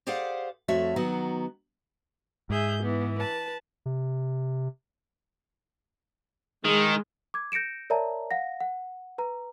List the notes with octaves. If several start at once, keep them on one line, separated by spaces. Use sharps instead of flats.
G4 G#4 C5 D5 F5 F#5
F2 A3 F#4 C#5 E5
D#3 F#3 B3 F#4
G#2 G#4 E5 G6
E3 B3
B4 A5
C3
D#3 G#3
D6 G#6
G6 A#6 C#7 D7 E7
A#4 C#5 D5 E5 A5 A#5
F5 F#5 A#6
F#5
B4 A#5